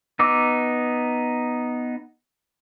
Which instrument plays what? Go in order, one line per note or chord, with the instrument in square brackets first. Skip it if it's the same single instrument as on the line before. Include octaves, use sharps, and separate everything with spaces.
[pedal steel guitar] B3 D#4 D6 E6